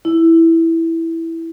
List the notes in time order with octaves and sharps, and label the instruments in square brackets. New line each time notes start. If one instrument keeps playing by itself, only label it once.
[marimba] E4